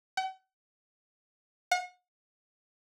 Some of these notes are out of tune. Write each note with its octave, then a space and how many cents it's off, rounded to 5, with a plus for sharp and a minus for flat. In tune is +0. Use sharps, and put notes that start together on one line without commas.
F#5 +45
F#5 -40